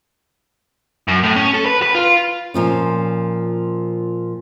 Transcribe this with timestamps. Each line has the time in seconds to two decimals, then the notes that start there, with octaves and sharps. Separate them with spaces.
1.08 F#2
1.23 A2
1.36 C#4
1.54 A4
1.66 B4
1.82 B4
1.95 F4
2.54 A#2 F3 C#4